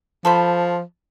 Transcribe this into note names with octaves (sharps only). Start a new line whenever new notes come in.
F3 A4 C5 B5